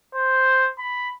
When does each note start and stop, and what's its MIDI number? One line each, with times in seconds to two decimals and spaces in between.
0.15 0.69 72
0.79 1.09 83